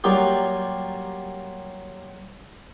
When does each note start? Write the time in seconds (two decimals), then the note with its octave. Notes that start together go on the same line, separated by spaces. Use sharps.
0.04 F#3 G3 A#3 F4 G4